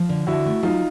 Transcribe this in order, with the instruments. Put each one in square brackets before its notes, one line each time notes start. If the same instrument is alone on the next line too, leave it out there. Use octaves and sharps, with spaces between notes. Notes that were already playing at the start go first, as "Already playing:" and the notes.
Already playing: [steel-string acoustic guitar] F3
D3
[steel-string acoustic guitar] D3 [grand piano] E4 F#4
[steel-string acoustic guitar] A3
[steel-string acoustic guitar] F#3 [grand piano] D#4 F4